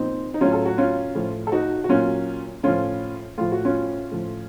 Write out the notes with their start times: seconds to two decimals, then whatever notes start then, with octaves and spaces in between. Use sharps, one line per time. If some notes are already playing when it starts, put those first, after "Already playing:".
Already playing: A#2 F3 C4 D#4
0.34 D#4
0.41 A2 F#3 C#4 F4
0.53 A4
0.66 F#4
0.78 C#4 F4
1.15 A2 F3
1.47 A4
1.52 D#4 F#4
1.84 F#4
1.89 A#2 F#3 C#4 F4
2.63 A2 F3 C#4 F4
3.38 A2 F3 F4
3.52 F#4
3.65 C#4 F4
4.11 A2 F3